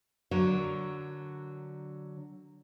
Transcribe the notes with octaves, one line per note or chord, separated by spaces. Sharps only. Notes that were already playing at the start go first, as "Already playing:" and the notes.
D3 F#3 A#4